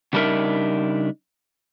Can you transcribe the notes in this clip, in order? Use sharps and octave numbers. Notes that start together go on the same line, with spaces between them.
C#3 G3 D4 D#4 A#4 E5